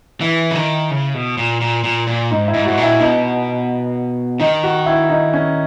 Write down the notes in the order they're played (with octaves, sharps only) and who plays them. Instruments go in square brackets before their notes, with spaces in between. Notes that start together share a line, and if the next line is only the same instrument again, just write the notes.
[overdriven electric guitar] E3 [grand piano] E4
[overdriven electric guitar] C#3
D#3
C#3
B2
A#2
A#2
A#2
A#2
[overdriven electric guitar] G#2 [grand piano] D#4
[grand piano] E4
[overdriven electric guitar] G#2
[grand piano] F#4
[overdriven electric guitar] G#2
A#2
[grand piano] E4
[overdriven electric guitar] B2 [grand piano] D#4
[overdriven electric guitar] D#3 [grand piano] D#4
[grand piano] F#4
E4
D#4
C#4